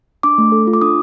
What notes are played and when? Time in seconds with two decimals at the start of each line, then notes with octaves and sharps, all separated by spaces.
0.23 D4 D6
0.38 A3
0.52 A4
0.67 F4
0.73 D6
0.81 D4 D#6